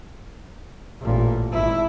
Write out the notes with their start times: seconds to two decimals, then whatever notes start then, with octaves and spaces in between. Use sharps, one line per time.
1.01 A1 A#2
1.52 G#1 E4